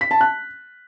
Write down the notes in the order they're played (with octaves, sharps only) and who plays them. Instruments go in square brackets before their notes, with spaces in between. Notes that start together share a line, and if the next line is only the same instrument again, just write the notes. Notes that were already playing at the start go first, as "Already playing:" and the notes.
[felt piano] B6
A5
F#6